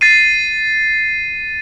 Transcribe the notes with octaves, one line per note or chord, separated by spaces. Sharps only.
A6 C7 D#7